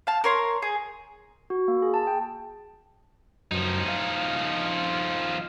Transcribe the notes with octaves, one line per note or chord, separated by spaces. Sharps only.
F5 A5
A#4 C#5 C6
G#4
F#4
A#3
G#4
A5
G5
F#2 F3 D#4
F5